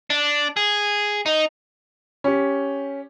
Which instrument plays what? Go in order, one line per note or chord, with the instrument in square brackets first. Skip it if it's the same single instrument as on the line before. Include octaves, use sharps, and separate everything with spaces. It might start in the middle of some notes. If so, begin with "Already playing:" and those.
[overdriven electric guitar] D4
G#4
D#4
[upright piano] C#4 G4